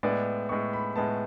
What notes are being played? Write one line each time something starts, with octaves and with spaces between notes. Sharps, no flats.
A2 G#3 B3 D5
A2 G#3 B3 C#6
B5
A2 G#3 B3 A5